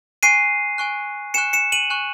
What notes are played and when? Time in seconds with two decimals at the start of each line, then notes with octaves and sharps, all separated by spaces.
0.23 G#5 C#6 F#6 C7 D#7
0.78 G#5 C#6 F#6
1.34 G#5 C#6 F#6 C#7 E7
1.53 C#7 E7
1.72 D#7 F#7
1.90 G#5 C#6 F#6